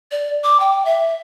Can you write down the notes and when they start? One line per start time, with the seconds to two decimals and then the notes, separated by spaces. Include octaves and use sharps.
0.11 D5
0.44 D6
0.60 G5
0.85 E5